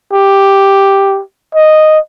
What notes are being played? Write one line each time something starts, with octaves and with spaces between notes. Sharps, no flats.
G4
D#5